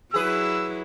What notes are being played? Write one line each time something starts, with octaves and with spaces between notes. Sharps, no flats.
F#3 E4 G#4 B4 E6